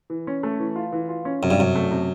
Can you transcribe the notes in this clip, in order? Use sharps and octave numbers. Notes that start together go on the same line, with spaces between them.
E3
C#4
A3
E3
F4
E3
F4
C#4
F#2 C3
G2
F#2 C3
A3
C3